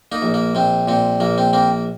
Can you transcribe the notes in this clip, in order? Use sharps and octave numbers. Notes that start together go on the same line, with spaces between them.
A#3 D#4
A#1
A#3
A#1 C4
A#2 C4
A#1 A#3
C4
A#3 C4